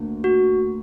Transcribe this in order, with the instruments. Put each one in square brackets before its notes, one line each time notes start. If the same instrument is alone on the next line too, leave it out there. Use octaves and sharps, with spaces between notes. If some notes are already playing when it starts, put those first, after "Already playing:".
Already playing: [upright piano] D2 D3 A#3
[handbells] F#4